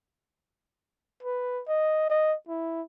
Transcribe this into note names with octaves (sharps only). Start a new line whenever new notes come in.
B4
D#5
D#5
E4